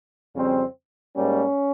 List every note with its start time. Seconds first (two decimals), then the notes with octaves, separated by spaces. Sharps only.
0.34 F2 C#3 G3 C4
1.16 G#2 G3 A#3 C#4